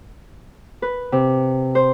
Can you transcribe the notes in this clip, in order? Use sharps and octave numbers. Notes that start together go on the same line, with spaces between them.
B4
C3
C5